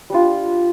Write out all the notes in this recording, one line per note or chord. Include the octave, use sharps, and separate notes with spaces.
G3 D4 F4